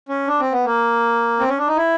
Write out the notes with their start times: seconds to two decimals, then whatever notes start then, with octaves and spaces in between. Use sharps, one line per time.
0.09 C#4
0.27 D4
0.40 C4
0.52 B3
0.65 A#3
1.40 C4
1.49 C#4
1.58 D4
1.68 D#4
1.77 E4